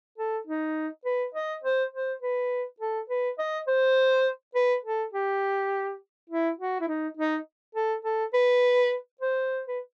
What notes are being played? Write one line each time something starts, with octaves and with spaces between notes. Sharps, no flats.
A4
D#4
B4
D#5
C5
C5
B4
A4
B4
D#5
C5
B4
A4
G4
E4
F#4
E4
D#4
D#4
A4
A4
B4
C5
B4